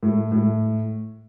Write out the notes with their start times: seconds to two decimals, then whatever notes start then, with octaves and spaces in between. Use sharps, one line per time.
0.03 A2
0.32 A2